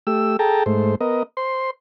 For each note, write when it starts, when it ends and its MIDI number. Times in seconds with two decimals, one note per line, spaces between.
0.07 0.37 57
0.07 0.37 67
0.07 0.37 88
0.39 0.64 68
0.39 0.64 69
0.39 0.64 79
0.39 0.64 81
0.39 0.64 82
0.66 0.95 44
0.66 0.95 57
0.66 0.95 72
1.01 1.23 59
1.01 1.23 70
1.01 1.23 75
1.37 1.71 72
1.37 1.71 84